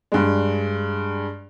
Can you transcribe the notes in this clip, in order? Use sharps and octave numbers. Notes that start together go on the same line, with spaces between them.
G2 G#3